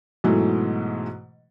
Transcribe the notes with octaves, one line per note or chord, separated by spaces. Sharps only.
G#2 B2 E3 F#3 A3